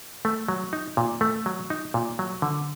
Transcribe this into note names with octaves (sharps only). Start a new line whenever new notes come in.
A3
F#3
D#4
A#2
A3
F#3
D#4
A#2
F#3
D3